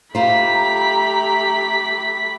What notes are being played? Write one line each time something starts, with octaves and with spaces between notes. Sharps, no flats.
A3 F4 G4 C5 A#5 B5 B6